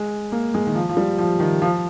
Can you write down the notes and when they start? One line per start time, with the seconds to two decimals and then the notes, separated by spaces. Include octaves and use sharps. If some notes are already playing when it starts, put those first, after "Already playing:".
Already playing: G#3
0.32 A#3
0.54 G#3
0.67 D#3
0.75 F3
0.89 F3
0.97 G3
1.19 F3
1.40 D#3
1.62 F3